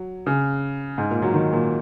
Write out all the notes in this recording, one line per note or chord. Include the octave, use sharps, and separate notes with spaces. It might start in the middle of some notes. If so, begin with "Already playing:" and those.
Already playing: F#3
C#3
G#2
A#2
F#3
D#3
A#2